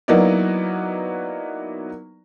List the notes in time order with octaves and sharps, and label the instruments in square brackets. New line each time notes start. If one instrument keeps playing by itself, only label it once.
[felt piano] F#3 A#3 B3 D#4 E4 D5